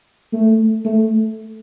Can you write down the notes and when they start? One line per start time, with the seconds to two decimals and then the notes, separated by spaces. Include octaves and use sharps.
0.33 A3
0.85 A3